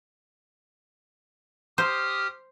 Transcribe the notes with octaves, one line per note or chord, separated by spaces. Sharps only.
G4 C5 D#6 F6